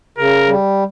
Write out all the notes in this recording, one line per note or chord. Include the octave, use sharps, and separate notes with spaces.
C#3 A#4
G3